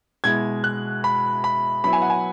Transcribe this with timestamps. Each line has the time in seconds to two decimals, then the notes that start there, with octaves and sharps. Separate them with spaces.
0.24 B2 G#3 E4 G#6
0.64 F#6
1.04 B5
1.44 B5
1.84 F#3 B3 E4 B5
1.93 G#5
2.02 F#5
2.10 G#5